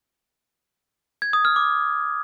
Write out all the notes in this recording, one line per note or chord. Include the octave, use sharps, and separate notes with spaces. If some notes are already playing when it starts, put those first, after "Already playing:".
G#6
D#6
F6
D6